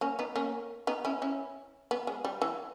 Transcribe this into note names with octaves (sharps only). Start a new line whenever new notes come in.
A#3 C#4
B3 D#4
A#3 C#4
B3 D#4
C#4 E4
C#4 E4
B3
G#3
G3
E3